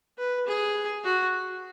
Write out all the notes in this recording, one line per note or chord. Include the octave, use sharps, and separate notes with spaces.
B4
G#4
F#4